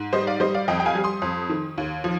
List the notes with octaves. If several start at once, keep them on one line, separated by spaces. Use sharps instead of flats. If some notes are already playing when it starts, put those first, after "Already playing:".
Already playing: G#2
G3 C5 D#5
D5 F5
G3 C5 D#5
D5 F5
F2 D#5 G5
G5
F5 G#5
G3
C6 D#6
F2
D#3
D#2
F3